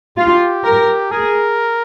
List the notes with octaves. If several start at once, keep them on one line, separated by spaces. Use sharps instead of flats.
F4 G4
A#4
G#4 A#4